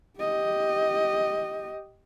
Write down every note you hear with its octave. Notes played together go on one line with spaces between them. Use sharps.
G4 D#5